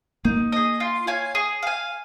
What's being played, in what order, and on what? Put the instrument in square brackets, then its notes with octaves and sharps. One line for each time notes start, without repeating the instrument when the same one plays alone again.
[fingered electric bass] A#3 [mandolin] D#4
[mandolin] G#4 D#5
F4
C#5 F5 G#5
G#4
F5 G#5